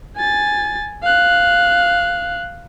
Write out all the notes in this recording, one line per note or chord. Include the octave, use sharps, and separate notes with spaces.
G#5 A6
F5 F#6